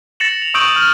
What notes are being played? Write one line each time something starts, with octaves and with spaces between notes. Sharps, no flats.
A6 A#6 C#7 E7 F#7
F7
C#6 D#6 E6 G6 D7 F#7
F6 G6